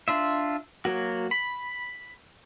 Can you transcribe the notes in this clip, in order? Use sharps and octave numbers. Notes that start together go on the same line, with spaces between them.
D4 F4 E5
F#3 A#3 F#4
B5